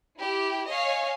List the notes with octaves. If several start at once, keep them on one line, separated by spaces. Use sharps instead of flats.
E4 G4
C#5 D#5 F5 G#5